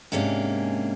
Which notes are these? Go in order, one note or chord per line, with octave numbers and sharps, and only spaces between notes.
G#2 C3 A#3 C#4 D4